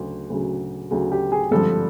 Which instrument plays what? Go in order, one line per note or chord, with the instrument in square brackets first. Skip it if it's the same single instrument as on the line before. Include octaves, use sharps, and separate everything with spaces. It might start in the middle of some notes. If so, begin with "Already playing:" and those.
Already playing: [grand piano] D2 C#3 F#3
D2 C#3 F#3
D2 C#3 F#3
G4
G#4
G#1 G2 D3 F3 A4